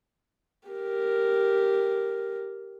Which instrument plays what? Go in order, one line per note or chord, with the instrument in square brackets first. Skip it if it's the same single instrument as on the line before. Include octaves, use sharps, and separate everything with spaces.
[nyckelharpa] G4 A#4